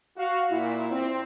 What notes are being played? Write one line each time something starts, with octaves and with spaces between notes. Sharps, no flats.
F#4 F5
A#2 E4
C4